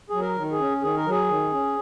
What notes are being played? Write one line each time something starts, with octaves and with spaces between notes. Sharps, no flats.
F#3 G#4
A#4
D#3
G#4
C#4
D#3 G#4
A#4
F#3 G#4
D#3
C#4